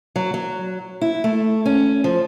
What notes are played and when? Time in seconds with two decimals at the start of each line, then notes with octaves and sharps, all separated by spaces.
0.16 F#3
0.34 F#3
1.01 E4
1.24 A3
1.66 C#4
2.04 F3